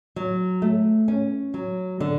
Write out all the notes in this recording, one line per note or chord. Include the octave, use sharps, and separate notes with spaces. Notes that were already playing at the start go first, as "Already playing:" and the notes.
F#3
A3
C#4
F#3
D3